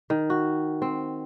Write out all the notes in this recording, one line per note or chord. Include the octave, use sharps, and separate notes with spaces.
D#3
F#4
C4